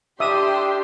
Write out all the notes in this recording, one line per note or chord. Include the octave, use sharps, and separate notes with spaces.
D4 G4 E5 C6 D#6